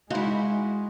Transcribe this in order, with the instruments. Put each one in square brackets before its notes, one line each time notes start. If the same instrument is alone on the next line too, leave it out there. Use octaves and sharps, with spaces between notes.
[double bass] G#3 [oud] D#4 E4 [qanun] F#4 [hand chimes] F5 C6